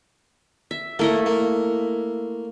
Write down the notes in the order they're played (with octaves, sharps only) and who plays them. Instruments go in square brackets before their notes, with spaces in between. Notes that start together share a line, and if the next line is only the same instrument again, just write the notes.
[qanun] E5
[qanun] A3 E4 D#5 [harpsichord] A#3
[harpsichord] A#3